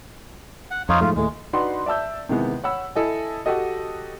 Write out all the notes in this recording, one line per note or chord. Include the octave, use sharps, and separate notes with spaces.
F#5
F2 D#4 F4 C#5
G#2 F3 A3 F4
D#2 A2 G#3 A3
D4 D#4 F#4 B4 F#5 C6
D5 E5 A5 E6 G6
C3 D#3 E3 G#3 B3
C#5 F#5 B5 E6
E4 A4 D#5 G#5
F#4 G4 A4 D#5